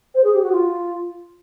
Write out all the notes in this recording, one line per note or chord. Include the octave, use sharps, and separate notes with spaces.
C5
G#4
G4
F#4
F4